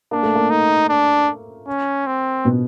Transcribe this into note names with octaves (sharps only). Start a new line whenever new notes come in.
A#3 D4
A3
A#3
D#4
D4
C#4
C4
B2 B3